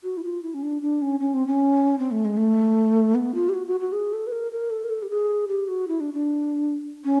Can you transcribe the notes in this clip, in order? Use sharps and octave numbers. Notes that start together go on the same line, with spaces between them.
F#4
E4
F4
E4
C#4
D4
D4
C#4
C#4
C4
C#4
C4
A3
G#3
A3
B3
F4
G4
F#4
F#4
F#4
G#4
A4
B4
A#4
A#4
A4
A#4
A4
G4
G#4
G4
F#4
E4
D4
D4
C#4